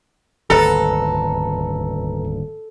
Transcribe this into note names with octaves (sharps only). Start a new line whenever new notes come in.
D#1 G#1 D2 A4 B4 A#5